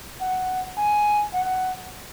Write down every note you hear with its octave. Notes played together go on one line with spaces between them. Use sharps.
F#5
G#5
F#5